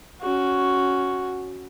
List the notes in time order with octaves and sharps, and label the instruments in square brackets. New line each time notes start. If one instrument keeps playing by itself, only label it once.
[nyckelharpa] C#4 F#4